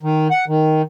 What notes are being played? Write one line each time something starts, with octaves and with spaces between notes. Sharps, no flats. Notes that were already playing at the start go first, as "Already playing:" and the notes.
D#3
F#5
D#3